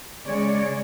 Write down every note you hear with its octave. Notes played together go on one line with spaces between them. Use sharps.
C#3 G#3 C#5 D5